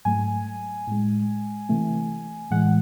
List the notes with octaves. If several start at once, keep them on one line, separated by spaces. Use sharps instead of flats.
G#2 F#3 A3 G#5
A2 G#3
C3 E3 A3
A2 E3 G#3 F#5